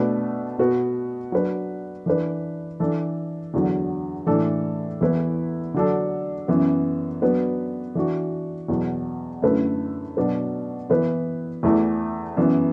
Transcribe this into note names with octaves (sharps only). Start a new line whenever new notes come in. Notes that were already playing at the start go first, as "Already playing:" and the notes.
Already playing: B2 A3 D4 B4
B2 B3 F#4 B4
F#3 D4 B4
E3 D4 B4
E3 D4 A4
E2 D3 F#3
A2 E3 D4 A4
E2 E3 B3 E4 B4
D3 F#3 D4 A4
F#2 E3 B3
F#3 B3 D4 B4
E3 D4 F#4
E2 B2 F#3
F#2 D3 A3 E4 B4
B2 F#3 D4 B4
E3 B3 E4 B4
E2 E3 A3 E4
F#2 E3 B3